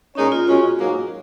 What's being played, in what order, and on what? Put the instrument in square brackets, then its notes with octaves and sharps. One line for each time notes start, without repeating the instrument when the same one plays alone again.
[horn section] A#2 G#3 D#4 A#4 C#5 [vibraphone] C#4
[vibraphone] F4
[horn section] B2 G#3 C#4 [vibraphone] F#4
[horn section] G#2 F#3 A#3 D#4 G#4